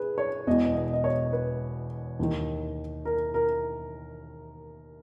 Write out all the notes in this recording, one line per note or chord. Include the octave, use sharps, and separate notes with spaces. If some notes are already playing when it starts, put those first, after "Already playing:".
Already playing: G#4 B4
C#5
E1 E2 B2 D#5
D#5
D#5
C#5
B4
D#2 D#3
A#4
A#4